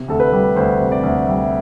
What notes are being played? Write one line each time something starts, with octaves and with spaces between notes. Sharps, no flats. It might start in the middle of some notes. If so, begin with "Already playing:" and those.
Already playing: C3
D2 A4
B4
G3
D2 C5
C3
D5
D2
G3 E5